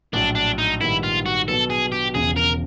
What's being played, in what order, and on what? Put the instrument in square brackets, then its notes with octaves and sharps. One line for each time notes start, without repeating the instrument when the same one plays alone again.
[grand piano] A#1 A2 F#3 [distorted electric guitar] D4
[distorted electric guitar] D4
D#4
[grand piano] A#1 G#2 D#3 G3 B3 [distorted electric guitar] E4
[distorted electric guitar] F4
F#4
[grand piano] B2 F#3 B3 [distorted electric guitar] A4
[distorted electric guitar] G#4
G4
[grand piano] E1 E2 C#3 F3 [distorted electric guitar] G#4
[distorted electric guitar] A#4